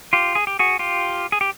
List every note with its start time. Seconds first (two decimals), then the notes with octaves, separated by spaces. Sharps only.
0.13 F4 G4
0.35 G#4
0.47 G4
0.59 F#4 G#4
0.79 F4 G4
1.32 G#4
1.41 G4